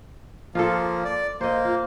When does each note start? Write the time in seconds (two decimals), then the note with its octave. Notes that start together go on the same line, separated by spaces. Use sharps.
0.55 F3 A#3 F4 A4
1.05 D5
1.41 A#3 C5 D#5
1.65 F4